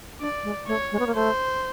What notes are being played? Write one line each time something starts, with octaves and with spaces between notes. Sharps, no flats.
D4 D5
G#3
A3 C#5
G#3
B3
A#3
A3 C5